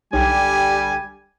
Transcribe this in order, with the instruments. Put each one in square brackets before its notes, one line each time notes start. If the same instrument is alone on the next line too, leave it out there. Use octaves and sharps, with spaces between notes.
[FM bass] B1 [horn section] D3 G4 G#5 [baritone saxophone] G3